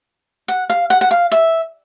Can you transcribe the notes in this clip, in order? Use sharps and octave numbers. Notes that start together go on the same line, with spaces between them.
F#5
F5
F#5
F#5
F5
E5